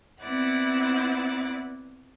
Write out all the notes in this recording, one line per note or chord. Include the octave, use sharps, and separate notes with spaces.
B3 C4 E4 D5 F#5